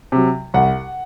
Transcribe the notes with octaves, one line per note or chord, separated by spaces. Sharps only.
C3 F#3
C2 F#5